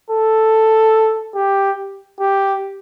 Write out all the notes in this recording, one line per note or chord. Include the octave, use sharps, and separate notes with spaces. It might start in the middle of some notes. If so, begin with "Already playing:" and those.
A4
G4
G4